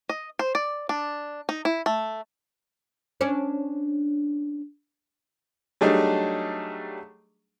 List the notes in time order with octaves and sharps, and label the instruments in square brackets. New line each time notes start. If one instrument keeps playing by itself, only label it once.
[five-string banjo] D#5
C5
D5
D4
D#4
E4
A3
[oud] C#4 D4
[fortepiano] F#3 G3 A3 D4 D#4 G#4